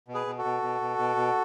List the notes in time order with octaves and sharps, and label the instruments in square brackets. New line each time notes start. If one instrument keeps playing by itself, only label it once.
[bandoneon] B2
G#4 B4
B2
F#4 A4
B2
B2
B2
B2
B2